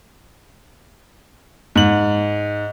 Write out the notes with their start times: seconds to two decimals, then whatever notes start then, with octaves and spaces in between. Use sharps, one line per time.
1.76 G#2 F#7